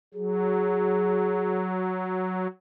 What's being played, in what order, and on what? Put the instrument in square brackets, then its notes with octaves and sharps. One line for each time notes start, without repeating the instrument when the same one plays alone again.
[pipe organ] F#3 [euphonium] G#4